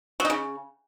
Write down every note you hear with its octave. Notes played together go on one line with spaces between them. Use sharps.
F#3
D#4
C#3